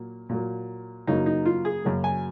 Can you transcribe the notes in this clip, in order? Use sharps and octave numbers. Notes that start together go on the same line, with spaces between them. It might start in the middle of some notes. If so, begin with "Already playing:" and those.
Already playing: A#2 F#3 A#3
A#2 F#3 A#3
F#2 C#3 F#3 A#3 D#4
D#4
F4
G#4
F#2 C#3 F#3 A#3
G#5